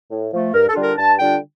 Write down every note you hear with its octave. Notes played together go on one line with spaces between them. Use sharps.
A2
F3 A3
G2 A#4
A4
D3 G3 D4 F4
A#4
G2 A5
D3 G3 D4 F4 G5